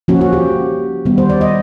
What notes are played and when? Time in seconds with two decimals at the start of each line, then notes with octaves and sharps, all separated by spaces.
0.08 F3 A#3 C#4 F#4
0.21 F#4
0.33 G4
1.05 D#3 G3 B3
1.18 C5
1.30 D5
1.41 D#5